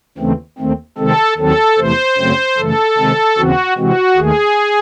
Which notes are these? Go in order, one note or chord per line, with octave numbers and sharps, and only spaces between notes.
D#2 C#3 E3 A3 C4
D#2 D#3 A3 C4
C3 D#3 G#3 C4 A4
D#2 D#3 F#3 C4 A4
E2 C3 E3 A3 C5
F#2 C#3 F#3 A3 C4
F#2 C#3 E3 A3 A4
C3 D#3 G#3 C4
D#2 C#3 E3 C4 F#4
C3 E3 G#3 C4 F#4
D#2 D#3 A3 G#4